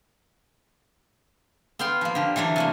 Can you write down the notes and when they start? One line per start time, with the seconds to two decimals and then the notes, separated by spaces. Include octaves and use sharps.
1.79 B3 F5 G5 C6
2.01 F3 A#3
2.15 D3 G4
2.36 E3 F#3 D4 C#5
2.56 C3 A3 A#3